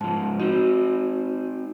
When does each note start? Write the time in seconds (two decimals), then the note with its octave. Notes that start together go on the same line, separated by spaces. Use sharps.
0.01 G#2 F3 A5
0.40 C4 D#4 F#4